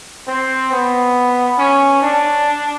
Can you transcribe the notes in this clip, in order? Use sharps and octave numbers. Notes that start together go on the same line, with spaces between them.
C4
B3
C#4
D4